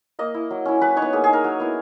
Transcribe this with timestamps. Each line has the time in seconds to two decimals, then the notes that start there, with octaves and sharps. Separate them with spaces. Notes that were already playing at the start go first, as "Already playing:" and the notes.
0.19 A#3 D#5
0.34 E4
0.51 F#3
0.65 C#4 E4
0.81 F#3 B4
0.96 D#4 C#5
1.02 B3
1.13 A#3 G#4
1.24 G#4
1.29 D#4 A#4
1.44 F#3
1.60 B3 E4